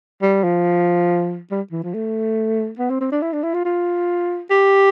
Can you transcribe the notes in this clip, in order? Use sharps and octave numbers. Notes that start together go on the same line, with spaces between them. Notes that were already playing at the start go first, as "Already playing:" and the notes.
G3
F3
G3
E3
F3
A3
B3
C4
C4
D4
E4
D4
E4
F4
F4
G4